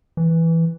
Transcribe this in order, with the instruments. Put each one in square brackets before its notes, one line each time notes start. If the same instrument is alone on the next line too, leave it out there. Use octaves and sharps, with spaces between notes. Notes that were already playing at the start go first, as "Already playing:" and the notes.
[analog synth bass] E3